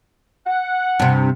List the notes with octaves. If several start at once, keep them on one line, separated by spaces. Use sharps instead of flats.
F#5
G2 C3